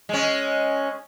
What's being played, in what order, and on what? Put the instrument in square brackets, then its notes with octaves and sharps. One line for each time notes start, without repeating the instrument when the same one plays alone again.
[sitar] G#3 C#4